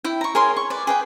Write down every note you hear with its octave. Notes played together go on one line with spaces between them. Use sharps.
E4 G5
A#5 C#6
G#4 A#4 C#5 C6
C#6
B4 D5
G#4 B4 G5